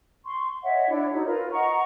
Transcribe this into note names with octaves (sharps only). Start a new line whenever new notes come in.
C6 C#6
C#5 D#5 E5 F#5
D4 E4 C#5
D#4 F#4 A4 C#5
F4 A#4 B4
D#5 F#5 A#5 C#6